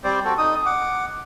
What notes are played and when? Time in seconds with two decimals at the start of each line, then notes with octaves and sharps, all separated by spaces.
0.04 G3 C4 C5 D5
0.25 C4 F#4 A4
0.38 D#4 D#6
0.66 F#5 D6